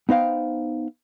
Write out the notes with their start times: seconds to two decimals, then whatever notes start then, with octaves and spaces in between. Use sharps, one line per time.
0.09 B3 D#4 C5 F5 G5